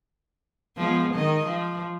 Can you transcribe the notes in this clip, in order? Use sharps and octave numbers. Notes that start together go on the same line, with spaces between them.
F3 G#3 B3
D#3 D#5
F3